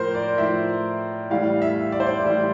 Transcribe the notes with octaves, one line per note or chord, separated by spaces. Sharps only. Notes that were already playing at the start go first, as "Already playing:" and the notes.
Already playing: A2 F3 A#4 C5
D5
A2 F3 E5
A2 E3 G3 F5
E5
D5
C5
D5
A2 E3 G3